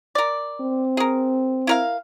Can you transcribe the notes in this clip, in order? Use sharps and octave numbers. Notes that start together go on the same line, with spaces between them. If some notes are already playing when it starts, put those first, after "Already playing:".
A#4 D5
C4
G#4 A#4
E4 A#4 F5